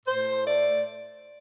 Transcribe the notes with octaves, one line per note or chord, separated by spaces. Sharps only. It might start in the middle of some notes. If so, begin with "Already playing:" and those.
A2 C5
A3 D5